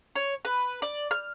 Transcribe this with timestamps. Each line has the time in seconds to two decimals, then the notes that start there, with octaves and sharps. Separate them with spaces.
0.16 C#5
0.45 B4
0.82 D5
1.11 F6